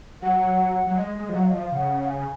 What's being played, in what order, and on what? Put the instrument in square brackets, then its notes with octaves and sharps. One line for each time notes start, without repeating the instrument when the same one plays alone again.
[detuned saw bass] F#3 [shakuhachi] F#5
[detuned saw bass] F#3
[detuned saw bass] G#3 [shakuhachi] D#5
[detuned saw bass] G#3
F3
[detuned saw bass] F#3 [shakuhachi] F#5
[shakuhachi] F5
D#5
[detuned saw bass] F3 [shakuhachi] F5
[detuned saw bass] C#3 [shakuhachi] F#5
[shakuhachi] F#5
G#5